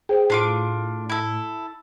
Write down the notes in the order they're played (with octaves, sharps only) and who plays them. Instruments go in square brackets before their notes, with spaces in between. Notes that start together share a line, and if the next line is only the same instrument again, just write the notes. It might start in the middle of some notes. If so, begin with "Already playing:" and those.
[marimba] G#4 C5 [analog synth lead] G5
[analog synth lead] A2 [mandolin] D4 F4 D6
[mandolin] E4 A4